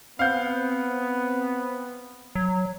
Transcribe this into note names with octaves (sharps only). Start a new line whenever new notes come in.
B3 C4 F5 F#5 G6
F#3